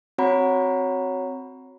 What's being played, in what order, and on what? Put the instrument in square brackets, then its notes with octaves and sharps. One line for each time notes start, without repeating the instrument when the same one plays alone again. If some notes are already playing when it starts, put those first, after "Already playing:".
[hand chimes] C4 F#4 C#5 F#5 A#5 B5